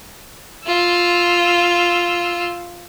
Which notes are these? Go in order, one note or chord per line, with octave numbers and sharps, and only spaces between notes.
F4 E6